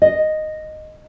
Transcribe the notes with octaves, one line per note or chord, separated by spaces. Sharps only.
D#5